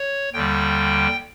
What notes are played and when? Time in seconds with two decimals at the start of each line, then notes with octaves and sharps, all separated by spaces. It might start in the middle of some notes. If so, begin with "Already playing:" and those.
Already playing: C#5
0.33 D#2 D3 G3 G5